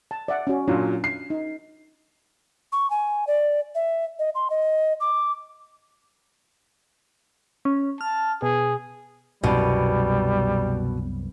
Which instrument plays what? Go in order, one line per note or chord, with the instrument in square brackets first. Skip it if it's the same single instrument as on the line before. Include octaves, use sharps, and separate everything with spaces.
[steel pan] A5
D5 E5 F#5
C#4 F#4
[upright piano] A#2 F#3 [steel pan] C#4 D4 F4
[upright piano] C7
[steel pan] D#4
[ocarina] C#6
G#5
D5
E5
D#5
C6
D#5
D6
[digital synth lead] C#4
[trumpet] A5 [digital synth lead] F6
[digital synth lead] B2 [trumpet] G#4
[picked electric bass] C2 F#2 [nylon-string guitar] B2 [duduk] G3